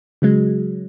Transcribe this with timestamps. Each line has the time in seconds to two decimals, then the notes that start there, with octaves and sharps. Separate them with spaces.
0.22 C#3 F#3 G#3